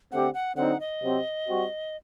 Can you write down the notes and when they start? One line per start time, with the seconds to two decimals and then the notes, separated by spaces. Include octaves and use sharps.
0.12 D3 A3 C4 G4 F#5
0.34 F#5
0.56 D3 F#3 C4 D#4 F#5
0.80 D#5
1.02 C3 F#3 C4 G4
1.48 G3 C4 F#4